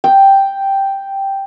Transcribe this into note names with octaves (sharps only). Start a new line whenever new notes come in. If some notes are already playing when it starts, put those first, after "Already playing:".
G5